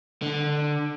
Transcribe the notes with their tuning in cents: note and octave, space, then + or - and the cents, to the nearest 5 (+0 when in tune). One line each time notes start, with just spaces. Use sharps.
D3 +10